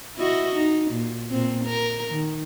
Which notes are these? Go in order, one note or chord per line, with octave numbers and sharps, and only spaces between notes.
E4 F#4 D#5
D#4
A#2
A#2 C4
A#4
D#3